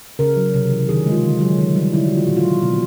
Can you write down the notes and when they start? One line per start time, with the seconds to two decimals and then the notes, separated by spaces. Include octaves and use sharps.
0.19 C#3 A#4
0.37 F#3
0.54 C3
0.71 E3
0.89 D#3 G#4
1.06 G#3
1.12 F4
1.23 D3
1.41 F#3
1.59 D#3
1.76 G3
1.93 D3 E4
2.05 F#4
2.11 F3
2.17 F4
2.27 A#2 F#4
2.37 F4
2.45 F#3
2.62 B2